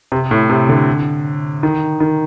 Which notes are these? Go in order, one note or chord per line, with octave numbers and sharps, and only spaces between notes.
C3
A2
C3
D3
D#3
D#3